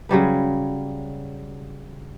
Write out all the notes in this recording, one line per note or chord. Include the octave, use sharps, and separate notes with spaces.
C#3 F#3 G3 B4